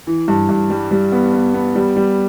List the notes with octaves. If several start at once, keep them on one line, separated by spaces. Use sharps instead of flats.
E3
G2
G2
G3
G3
B3
B3
B3
G3
G3